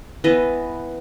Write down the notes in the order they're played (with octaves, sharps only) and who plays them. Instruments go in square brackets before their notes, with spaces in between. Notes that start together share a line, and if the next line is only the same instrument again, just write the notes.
[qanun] E3 B3 B4 D#5